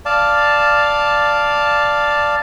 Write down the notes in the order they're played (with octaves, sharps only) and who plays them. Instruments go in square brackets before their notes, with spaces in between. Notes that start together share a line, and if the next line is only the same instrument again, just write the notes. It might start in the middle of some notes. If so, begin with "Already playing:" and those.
[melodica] D5 F5 A5